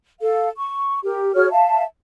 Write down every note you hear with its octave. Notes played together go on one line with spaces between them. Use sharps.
A4 F5
C#6
G4 A#4
F#4 G#4 C#5 F6
E5 F5 A5